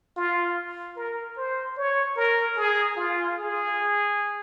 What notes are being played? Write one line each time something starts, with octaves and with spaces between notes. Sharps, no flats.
F4
A#4
C5
C#5
A#4
G#4
F4
G#4